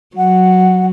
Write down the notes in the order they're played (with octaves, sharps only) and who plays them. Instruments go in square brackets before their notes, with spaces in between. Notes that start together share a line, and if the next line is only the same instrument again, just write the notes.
[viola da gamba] F#3 [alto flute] F#5